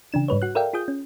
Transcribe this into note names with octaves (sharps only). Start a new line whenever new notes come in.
C#3 E3 D4 E7
G#2 G3 B4 C#5
F#4 F#6
A4 A#4 D5 E5 F5 G5
F4 G#4 D#6 G6
C#4